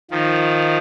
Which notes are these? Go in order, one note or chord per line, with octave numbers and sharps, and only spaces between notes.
D#3 F3